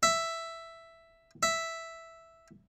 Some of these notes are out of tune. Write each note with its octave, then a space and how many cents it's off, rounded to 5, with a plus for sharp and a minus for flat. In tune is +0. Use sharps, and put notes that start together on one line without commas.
E5 +5
E5 +0